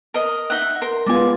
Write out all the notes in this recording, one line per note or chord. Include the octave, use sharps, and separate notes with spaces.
A#4 D#5
D#4 E5 F#5
A#4 C6
G#3 B3 F4 D5 G#5